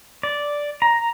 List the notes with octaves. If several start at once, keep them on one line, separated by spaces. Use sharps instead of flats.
D5
A#5